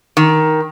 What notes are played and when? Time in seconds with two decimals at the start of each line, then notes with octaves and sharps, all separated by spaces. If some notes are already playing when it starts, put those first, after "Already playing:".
0.17 D#3